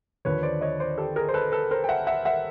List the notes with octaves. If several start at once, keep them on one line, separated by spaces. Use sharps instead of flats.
D#2 D3 F3 B4 C#5
C5 D5
C#5 D#5
C5 D5
G4 A4
G#4 A#4
C5
A4 B4
A4 B4
A#4 C5
G5
E5 F#5
E5 F#5
E5 F#5